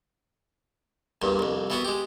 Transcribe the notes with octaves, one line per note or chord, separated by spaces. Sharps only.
E2 G2 A#2
C2 F2
E3 B3 F#4
G#3 G4